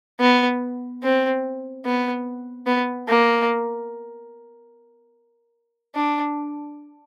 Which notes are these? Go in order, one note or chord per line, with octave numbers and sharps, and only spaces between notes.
B3
C4
B3
B3
A#3
D4